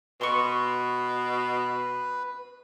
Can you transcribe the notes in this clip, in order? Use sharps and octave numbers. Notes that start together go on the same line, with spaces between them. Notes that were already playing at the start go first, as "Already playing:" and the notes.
B2 B4 C6 C#6